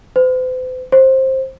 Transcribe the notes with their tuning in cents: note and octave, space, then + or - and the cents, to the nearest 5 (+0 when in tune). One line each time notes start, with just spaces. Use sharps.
C5 -45
C5 +15